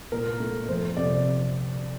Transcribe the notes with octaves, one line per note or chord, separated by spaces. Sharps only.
A#2 A#4
A3
F2 C5
C3 D5